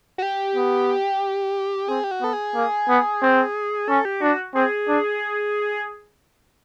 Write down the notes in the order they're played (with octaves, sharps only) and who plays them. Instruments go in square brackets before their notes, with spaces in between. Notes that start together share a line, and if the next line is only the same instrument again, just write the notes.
[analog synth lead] F#4
G4
[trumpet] B3
[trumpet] C4 [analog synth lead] G#4
[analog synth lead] G4
F#4
[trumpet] B3 [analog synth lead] A4
[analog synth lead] G#4
[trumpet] A#3
B3
C4
[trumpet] C#4 [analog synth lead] A4
[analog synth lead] G4
[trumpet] D4 [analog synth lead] F#4
[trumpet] C4 [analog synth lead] G#4
[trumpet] D4